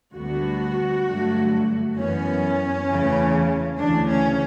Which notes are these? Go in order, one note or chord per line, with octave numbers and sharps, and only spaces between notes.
D2 D3 G3 B3 F#4
G2 D3 F#3 A3
F#2 E3 B3 C#4
E2 C#3 E3 A3
D2 C#3 E3 D4
C#4